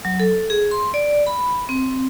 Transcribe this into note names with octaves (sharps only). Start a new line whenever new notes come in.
F#3
A4
G#4
C6
D5
B5
C4